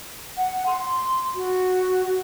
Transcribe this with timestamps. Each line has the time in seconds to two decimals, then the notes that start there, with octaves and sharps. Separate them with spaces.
0.38 F#5
0.66 C6
1.35 F#4